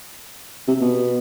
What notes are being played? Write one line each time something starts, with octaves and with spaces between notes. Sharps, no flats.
C3
B2